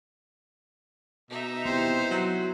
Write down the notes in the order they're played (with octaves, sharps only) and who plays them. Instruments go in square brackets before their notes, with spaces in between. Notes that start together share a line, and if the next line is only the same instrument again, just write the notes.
[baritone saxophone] B2 [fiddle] D#4 E5
[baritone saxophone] C3 [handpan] B3 E4 [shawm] C5
[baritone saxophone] F#3